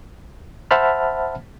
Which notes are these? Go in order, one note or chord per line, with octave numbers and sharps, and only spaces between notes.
C5 E5 F#5 A5 B5 F6